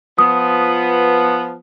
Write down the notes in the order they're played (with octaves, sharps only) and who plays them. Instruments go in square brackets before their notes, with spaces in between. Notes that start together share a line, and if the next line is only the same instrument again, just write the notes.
[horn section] F3 B3 [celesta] D#6